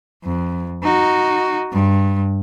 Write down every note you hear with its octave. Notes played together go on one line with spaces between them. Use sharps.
F2
D#4 F#4
G2